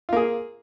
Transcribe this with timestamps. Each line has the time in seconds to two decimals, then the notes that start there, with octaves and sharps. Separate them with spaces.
0.09 F4
0.13 A#3
0.17 G#4